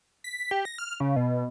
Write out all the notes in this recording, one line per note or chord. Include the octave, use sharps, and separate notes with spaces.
B6
G4
A#6
F6
C#3
B2